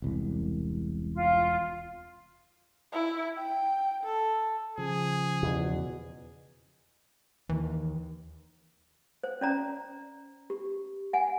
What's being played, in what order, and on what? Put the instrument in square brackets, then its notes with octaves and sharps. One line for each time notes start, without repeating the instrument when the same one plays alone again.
[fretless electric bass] E1 C2
[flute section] F4
[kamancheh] E4
G5
A4
[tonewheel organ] C#3 F3 [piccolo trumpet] G#4
[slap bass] E2 B2
[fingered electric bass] D#2 D#3 [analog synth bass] E3
[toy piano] C5
C#4 D5 A#5
G4
F#5 G#5